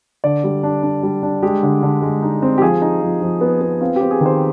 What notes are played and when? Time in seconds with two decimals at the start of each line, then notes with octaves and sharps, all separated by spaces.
0.24 D3 D5
0.44 G3
0.63 D4
0.83 D4
1.03 G3
1.23 D4
1.43 G#3 G4
1.63 D3
1.83 D3
2.02 G#3
2.22 D#4
2.42 C4
2.58 G4
2.62 F3 G#4
2.82 D#4
3.01 F3
3.22 F3
3.41 B3
3.61 B3
3.81 C4 F4
3.96 C4 G4
4.11 G#4
4.21 D#3
4.26 C5